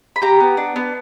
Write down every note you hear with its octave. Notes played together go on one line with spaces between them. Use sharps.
B5
G4 A#5
B3
D4
B3